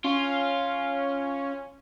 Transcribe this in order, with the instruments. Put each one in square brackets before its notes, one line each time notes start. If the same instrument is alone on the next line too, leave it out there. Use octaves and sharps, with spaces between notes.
[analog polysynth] C#4 [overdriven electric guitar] F4